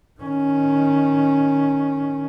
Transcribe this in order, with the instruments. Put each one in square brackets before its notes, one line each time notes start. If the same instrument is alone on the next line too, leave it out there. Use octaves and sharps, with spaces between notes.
[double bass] D#3 C#4